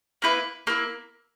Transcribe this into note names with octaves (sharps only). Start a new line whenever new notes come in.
A#3 E4 B4
A#3 E4